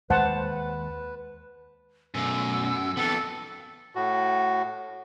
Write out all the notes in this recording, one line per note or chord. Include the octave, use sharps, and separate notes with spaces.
D#2 G#3 B4 C5 F#5 A5
F#2 B2 A3 E6
F2 D#3 B3 A4
A2 F#4